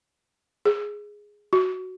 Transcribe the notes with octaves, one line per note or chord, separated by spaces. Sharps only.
G#4
F#4